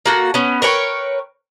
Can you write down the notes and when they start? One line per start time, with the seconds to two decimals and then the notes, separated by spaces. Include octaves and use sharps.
0.06 A#3 F#4 A4
0.34 B3 C#4
0.62 A#4 B4 C#5 G5